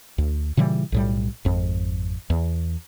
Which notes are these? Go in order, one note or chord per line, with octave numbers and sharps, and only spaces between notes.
D2
A#2 C#3 E3 G3
B1 A2 G3
G#1 F2
E2